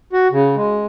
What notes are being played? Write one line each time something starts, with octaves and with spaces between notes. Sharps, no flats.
F#4
C#3
G#3